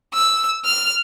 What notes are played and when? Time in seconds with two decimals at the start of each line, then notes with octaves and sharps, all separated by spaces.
0.14 E6
0.65 F6